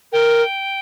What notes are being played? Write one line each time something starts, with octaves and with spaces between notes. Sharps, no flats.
A#4 G5